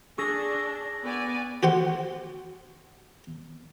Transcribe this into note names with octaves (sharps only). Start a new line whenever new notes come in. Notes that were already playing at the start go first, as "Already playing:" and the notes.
D4 G#4 C#6 E6 A#6
B3 D5 G#5
F#4 G4 C5 F#5